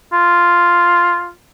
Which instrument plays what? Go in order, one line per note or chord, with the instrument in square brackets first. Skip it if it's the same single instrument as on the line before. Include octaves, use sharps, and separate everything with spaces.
[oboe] F4